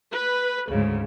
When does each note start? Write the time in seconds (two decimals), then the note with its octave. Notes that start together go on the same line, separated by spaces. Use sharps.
0.12 B4
0.70 D2 G#2 C#3